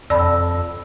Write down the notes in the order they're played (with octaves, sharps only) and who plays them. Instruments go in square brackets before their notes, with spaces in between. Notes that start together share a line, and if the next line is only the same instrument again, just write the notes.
[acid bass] F2 [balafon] D5 A5 B5 [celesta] E6